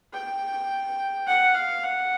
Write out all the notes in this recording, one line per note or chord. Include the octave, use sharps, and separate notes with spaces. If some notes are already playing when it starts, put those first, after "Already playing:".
G5
F#5
F5
F#5